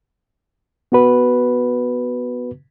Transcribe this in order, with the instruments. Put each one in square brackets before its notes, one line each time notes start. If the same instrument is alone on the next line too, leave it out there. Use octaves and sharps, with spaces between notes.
[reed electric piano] B3 F#4 B4